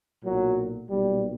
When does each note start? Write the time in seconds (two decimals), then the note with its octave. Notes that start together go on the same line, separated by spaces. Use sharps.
0.24 B1 A#2 F#3
0.89 B1 A#2 G3